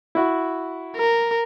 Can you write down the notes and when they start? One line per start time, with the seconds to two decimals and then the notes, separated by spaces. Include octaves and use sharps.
0.15 E4 F#4
0.96 A#4